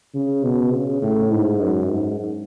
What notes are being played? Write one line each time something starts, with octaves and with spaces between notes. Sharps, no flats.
C#3
B2
C#3
A2
G#2
F#2
G#2